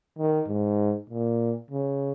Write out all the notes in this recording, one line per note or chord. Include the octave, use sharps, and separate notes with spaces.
D#3
G#2
A#2
C#3